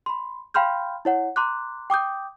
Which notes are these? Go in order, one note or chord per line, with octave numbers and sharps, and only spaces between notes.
B5 C6
F5 G5 B5 C6 F6 G6
E4 C#5 F#5
A#5 C6 D6 F#6
G5 D6 D#6 G6